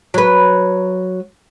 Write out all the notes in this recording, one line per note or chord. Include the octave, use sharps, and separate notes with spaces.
F#3 B4